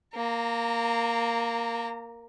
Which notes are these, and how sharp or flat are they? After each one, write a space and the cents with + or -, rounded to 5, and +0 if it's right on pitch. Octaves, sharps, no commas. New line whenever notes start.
A#3 +0 A#5 -30